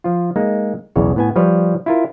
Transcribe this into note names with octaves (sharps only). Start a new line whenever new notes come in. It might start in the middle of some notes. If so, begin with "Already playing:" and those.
F3 F4
G#3 A#3 D#4
B1 E2 C#3 C#5
A2 B3 G#5
F3 G3 B4 C#5
E4 F4 A#4